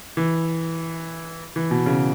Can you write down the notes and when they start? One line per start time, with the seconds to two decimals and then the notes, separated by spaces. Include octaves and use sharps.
0.17 E3
1.56 E3
1.71 B2
1.86 C#3